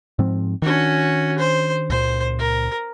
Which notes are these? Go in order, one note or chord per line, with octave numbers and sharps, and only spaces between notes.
G#2 F3 C4
D#3 C#4 D4 F#4
C5
C#2 A#2 C5
A#4